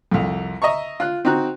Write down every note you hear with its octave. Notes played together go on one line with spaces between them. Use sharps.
C2 F2
D#5 E5 A#5 C#6
F4 F#6
C4 D#4 F#4 A#5 F#6